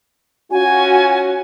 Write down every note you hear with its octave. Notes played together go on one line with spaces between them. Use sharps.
C#4 F4 F#4 G#5